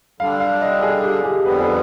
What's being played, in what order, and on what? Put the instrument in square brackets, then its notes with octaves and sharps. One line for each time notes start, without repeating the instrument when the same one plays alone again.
[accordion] D3 G3 D4 [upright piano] F5
[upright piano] F5
D#5
G#4
G4
G#4
[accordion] F2 D3 G3 B3 [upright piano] B4
[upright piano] G#4